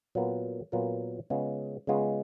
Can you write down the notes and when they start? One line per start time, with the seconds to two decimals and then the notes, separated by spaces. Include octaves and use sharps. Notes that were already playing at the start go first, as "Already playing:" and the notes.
0.15 A#2 F#3 B3 F4 A#4
0.72 A#2 F#3 B3 F4 A#4
1.30 C#3 G#3 B3 F4 G#4
1.87 C#3 G#3 B3 F4 G#4